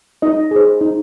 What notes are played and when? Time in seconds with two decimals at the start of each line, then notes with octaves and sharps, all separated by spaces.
0.22 D#4 D#5
0.51 G#4 C5
0.81 D#4